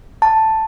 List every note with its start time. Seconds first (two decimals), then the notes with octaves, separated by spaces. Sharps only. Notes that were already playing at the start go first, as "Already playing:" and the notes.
0.22 A5